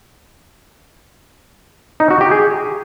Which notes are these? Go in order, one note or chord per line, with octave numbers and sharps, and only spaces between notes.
D#4
F#4
G4
G#4